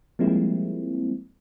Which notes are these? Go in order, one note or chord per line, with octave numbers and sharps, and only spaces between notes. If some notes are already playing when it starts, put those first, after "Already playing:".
F3 G3 G#3 A#3 C4 E4